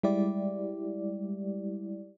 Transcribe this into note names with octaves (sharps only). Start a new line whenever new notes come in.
G3 G#3 E4 G4 D5